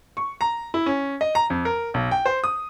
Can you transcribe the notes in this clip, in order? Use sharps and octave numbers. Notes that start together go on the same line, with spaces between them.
C#6
A#5
E4
C#4
D#5
A#5
F2
A#4
B1
G5
C5
D#6